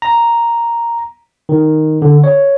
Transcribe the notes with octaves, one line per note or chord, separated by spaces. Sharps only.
A#5
D#3
D3
C#5